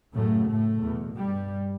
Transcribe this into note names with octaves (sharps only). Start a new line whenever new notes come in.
F#2 A2 C#3 A3
A2 A3
E2 B2
G2 G3